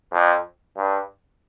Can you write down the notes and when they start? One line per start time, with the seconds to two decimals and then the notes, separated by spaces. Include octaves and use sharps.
0.13 F2
0.77 G2